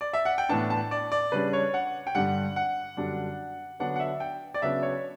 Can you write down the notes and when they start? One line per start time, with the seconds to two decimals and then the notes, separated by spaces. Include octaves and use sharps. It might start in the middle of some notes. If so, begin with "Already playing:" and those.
0.01 D5
0.13 E5
0.25 F#5
0.38 G5
0.49 A2 E3 B3 D4 A5
0.70 A5
0.91 D5
1.12 D5
1.32 C#3 G3 D4 B4
1.53 C#5
1.74 F#5
2.07 G5
2.15 G2 D3 G3 F#5
2.56 F#5
2.97 F#2 D3 G3 D4
3.80 D3 F#3 B3 D4 F#5
3.96 F#5
4.00 E5
4.20 G5
4.54 D5
4.62 C#3 F#3 B3 D4 E5
4.83 C#5